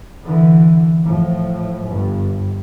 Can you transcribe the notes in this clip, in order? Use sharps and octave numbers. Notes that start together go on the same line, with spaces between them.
D3 E3
A2 F3
G1 G2